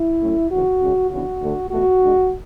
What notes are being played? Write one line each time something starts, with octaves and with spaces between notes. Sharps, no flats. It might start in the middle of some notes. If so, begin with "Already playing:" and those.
Already playing: E4
A2 F#3 A3 C#4
D2 C#3 E3 F#4
C#3 G#3 C#4
C#3 E3 B3 D4 F#4
D2 D3 A3 D4
E2 B2 A3 F#4
B2 G#3 D4